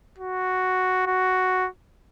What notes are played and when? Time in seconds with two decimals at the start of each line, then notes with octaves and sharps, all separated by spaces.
0.18 F#4
1.06 F#4